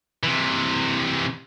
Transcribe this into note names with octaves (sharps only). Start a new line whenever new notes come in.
C3 E3